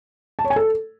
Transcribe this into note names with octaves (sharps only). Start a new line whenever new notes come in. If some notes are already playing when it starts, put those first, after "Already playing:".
A5
C#5
G#5
A4